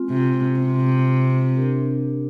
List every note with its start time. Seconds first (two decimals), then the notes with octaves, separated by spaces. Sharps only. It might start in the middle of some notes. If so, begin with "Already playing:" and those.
Already playing: G#3 C4 F4
0.10 C3
0.59 C3
1.57 D4 G4 A#4